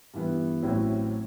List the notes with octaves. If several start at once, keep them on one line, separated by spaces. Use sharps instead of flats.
G2 E3 B3
A1 A2 F#3 C4 E4